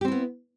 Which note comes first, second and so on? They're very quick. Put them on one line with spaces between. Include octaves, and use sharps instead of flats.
G4 C4 E4 B3